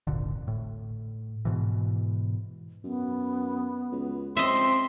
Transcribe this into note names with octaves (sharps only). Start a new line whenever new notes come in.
D1 G#1 A#2 D3
A2
G#2 B2 E3
F#2 B3
C#2
C#2 C4 D#5 E5 C6